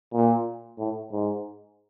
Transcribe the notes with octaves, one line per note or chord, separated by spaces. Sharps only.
A#2
A2
G#2